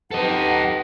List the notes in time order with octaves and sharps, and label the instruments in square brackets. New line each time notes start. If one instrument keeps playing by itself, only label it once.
[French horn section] D#4 G4 B4 [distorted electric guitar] A4 D#5 [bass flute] F#5